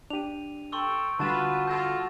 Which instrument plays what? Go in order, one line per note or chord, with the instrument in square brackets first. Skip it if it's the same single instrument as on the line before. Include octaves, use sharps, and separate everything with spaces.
[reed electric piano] D4 G4 [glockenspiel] D#7 F7
[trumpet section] A4 G5 [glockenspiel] C6 C#6 E6
[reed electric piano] D3 G3 [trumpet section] F4 B4 [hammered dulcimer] F#4 [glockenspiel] A5 A6 E7
[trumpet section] F4 A4 [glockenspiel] G6 A#6 E7